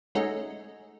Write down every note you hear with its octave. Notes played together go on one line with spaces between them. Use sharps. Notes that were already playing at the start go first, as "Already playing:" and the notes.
G#3 A3 C#4 D#4 F#4